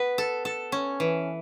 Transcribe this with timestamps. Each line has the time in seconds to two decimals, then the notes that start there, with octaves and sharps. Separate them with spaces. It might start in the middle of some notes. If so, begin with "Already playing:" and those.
Already playing: B3 B4
0.18 A4
0.45 A4
0.72 C#4
1.00 E3